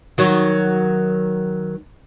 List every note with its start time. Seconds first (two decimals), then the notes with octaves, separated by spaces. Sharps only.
0.18 D#3 F#3